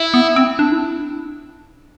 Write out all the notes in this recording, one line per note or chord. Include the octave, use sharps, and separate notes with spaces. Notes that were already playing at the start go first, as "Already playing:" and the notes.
Already playing: E4
B3
C4
D4
E4
D4